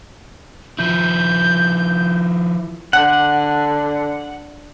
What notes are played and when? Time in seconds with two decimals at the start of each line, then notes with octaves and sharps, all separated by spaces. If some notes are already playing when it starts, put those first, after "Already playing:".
0.79 F3 E4 G6
2.93 D3 F#5